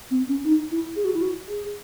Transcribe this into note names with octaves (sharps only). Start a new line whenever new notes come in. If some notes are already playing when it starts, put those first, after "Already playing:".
C4
C#4
D#4
E4
G#4
F#4
E4
F#4
G#4